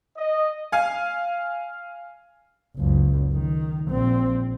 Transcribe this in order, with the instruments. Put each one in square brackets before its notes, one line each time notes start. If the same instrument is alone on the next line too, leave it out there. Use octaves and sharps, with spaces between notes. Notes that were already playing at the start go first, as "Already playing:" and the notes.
[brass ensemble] D#5
[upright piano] F5 G#5
[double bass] F#1 C#2
D#3
A#1 C4